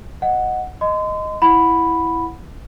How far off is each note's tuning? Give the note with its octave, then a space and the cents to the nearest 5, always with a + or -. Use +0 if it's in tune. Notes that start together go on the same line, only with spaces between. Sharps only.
D#5 +0 F#5 +0
D#5 +0 C6 -35
E4 +0 F#5 -15 B5 +0